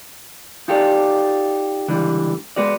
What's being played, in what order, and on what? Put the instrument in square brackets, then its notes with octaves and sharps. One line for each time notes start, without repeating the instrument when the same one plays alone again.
[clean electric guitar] D#4 F4 G4 A4 D5
C#2 D3 E3 G3
G#3 B3 F#4 D5